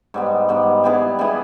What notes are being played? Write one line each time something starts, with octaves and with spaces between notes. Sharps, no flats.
G#2 G3 B3
G#2 G3 B3
G3 B3 E4 G#4
G3 B3 E4 G#4